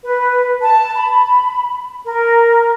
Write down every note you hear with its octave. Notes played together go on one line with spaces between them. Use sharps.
B4
A5
B5
A#4